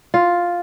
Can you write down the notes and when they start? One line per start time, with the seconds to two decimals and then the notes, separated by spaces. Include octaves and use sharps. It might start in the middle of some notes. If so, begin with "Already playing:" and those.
0.14 F4